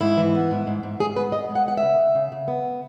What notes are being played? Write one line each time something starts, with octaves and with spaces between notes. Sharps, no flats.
G#2 E4
E3
B3
G#2
G#2
G#2
G#2 G#4
B3 B4
B3 D#5
G#3
F#5
B3 F#5
E5
C#3
C#3
C#3
C#3
B3